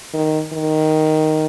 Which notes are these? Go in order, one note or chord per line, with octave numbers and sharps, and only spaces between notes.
D#3
D#3